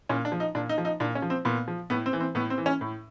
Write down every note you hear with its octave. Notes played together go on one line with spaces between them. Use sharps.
A#2 C#4
D4
F3
D#4
A#2 D4
D#4
F3
D#4
A#2 D4
C#4
F3
C4
A#2 B3
F3
A2 B3
C4
E3
C4
A2 B3
C4
E3
C#4
A2